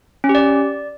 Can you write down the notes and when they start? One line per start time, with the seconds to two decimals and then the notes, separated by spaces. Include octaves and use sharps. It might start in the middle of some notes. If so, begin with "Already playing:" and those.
0.24 C#4
0.29 G4
0.35 D5